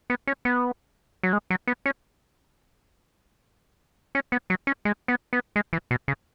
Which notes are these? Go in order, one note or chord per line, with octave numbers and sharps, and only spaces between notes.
B3
C#4
B3
F#3
G#3
F#3
B3
C#4
C#4
B3
F#3
C#4
G#3
B3
B3
G#3
E3
B2
C#3